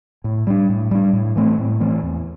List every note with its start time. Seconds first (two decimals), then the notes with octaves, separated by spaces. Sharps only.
0.24 A2
0.47 G3 D4
0.69 A2
0.91 G3 D4
1.13 A2
1.36 E3 A3 C4
1.59 A2
1.80 E3 A3 C4
2.03 E2